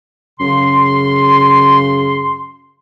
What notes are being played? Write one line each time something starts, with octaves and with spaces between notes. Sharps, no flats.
F#2 C#3 C6